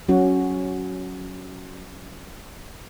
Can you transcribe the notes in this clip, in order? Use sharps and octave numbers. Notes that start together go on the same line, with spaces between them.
F#3 C#4 F#4